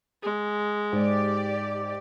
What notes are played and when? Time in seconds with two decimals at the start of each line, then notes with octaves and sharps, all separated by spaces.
0.23 G#3
0.93 G#2 G4 D5